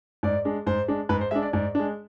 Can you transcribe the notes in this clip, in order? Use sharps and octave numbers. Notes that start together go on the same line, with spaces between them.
G#2 D5
G#3 D4
G#2 C5
G#3 D4
G#2 B4
C5
G#3 D4 E5
D5
G#2 D5
G#3 D4